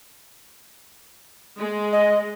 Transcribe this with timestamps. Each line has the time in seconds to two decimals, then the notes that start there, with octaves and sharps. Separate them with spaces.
1.59 G#3
1.93 D#5